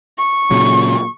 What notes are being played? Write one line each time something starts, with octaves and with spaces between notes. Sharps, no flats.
C#6
A#2 C#3 F#3